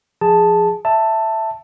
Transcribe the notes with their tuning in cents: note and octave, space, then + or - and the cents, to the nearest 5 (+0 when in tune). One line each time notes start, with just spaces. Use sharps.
F3 +0 G#4 +0 A5 +0
E5 +0 A5 +10